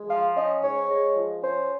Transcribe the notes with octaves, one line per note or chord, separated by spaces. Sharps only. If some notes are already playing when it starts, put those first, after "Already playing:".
Already playing: G#3
F3 F5
C#4 D#5
G#2 C#5
G#3
F3
C#4 C5